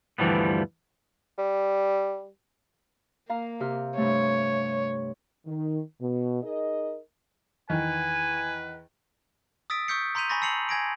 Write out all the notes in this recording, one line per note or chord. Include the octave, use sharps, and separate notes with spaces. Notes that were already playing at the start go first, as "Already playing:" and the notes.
D2 G2 E3 F3 G3 B3
G3
A#3 F5 A#5
C3 G4 F6
G2 C3 A3 C#5
D#3
B2
D#4 G#4 A#4 D#5
E2 D#3 B4 G#5
D#6 E6 A6 B6 D7
C#6 D#6 E6 G6 B6 C#7
A#5 C6 G6 B6 D#7 F7
G#5 A#5 B5 C#6 A6 A#6
A5 E6 C7 C#7 F7 F#7
G#5 G#6 A#6 D7